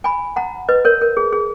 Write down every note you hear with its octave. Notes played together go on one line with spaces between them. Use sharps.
G#5 B5
F#5 A#5
B4 D#5
A#4 C#5
A#4
G#4
G#4